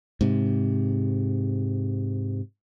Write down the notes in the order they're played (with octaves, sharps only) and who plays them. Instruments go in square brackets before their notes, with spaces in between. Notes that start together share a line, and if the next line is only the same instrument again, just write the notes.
[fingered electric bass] G#2 C3